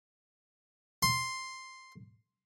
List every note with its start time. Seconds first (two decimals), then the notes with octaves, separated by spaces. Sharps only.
1.03 C6